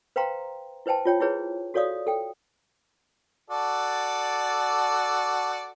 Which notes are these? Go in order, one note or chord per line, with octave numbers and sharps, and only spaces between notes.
B4 C5 F5 G5 A#5 C6
E4 B4 C5 G5 A5
F4 C#5 G5
E4 G4 G#4 B4 C#5
F#4 A4 C#5 D5 F5 D#6
A4 G5
F#4 A4 D5